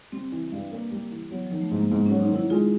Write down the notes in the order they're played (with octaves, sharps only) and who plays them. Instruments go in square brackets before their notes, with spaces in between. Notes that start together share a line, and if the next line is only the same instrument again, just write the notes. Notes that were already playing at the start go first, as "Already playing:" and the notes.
[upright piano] G3 [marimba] C4
[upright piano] E3
G2
A#3
G3
E3
[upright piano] F#3 [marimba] B3
[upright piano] D#3 [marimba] F3
[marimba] A3
[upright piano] G#2
[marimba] A#3
[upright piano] G#2 [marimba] B3
[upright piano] F#3 [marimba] C#4
[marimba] D#4
[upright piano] D#3
[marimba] E4
[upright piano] G#3 [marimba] F4